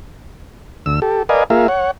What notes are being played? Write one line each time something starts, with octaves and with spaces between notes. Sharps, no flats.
D2 E6
G4 A4
A#4 B4 D5 D#5 F5 G#5
A#3 F4 G#4 A#4 E5 F5
C#5 F#5